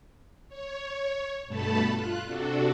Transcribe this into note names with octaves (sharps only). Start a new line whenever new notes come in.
C#5
G2 B2 A3 A4 A5 B5
F4 F#6
C3 D4 F#4 A4